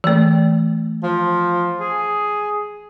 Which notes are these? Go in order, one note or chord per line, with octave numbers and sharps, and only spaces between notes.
E3 A3
F3
G#4